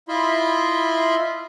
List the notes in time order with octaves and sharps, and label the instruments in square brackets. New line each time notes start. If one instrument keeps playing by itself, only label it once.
[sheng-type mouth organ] E4 F4 D#5 E5 B5 C6